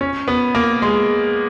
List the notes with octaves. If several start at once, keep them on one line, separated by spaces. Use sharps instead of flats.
C#4
B3
A#3
G#3